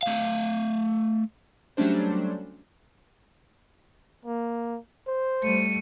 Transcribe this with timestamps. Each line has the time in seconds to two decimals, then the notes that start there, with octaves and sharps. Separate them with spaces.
0.03 A3 F5
1.77 F#3 G3 A3 C#4 D4 C5
4.25 A#3
5.07 C5
5.43 G3 A3 C#7 D#7